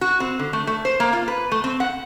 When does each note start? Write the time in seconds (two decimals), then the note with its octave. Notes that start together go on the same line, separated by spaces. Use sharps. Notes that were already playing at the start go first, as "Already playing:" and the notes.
0.01 F#4
0.20 C4
0.39 D3
0.53 A3
0.67 A3
0.85 C5
1.00 A#3
1.13 F4
1.28 B4
1.52 A3
1.64 C4
1.80 F#5